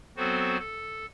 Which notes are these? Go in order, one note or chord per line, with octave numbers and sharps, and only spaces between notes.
F#3 B3 C4 F#4 A4 C5
A4